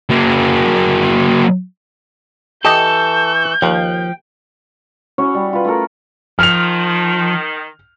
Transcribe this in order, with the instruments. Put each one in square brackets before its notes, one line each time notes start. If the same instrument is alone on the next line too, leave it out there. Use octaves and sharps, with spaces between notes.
[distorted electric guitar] F#3 A#3
[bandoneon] E3 C#6 E6 [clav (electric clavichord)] G4 D#5 [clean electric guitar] A4 [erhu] G6
[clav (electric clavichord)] D#2 [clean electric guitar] F3 [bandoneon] G5
[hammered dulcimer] C#4 E4 F#4 C#5
G3
F4 B4
A3 E4 A4 A#4
[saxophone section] D#3 [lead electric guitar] F3 [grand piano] F6 F7